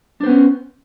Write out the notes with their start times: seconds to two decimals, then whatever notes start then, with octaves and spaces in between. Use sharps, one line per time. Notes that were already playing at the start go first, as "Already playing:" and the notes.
0.21 D4
0.23 C5
0.26 B3
0.29 C#4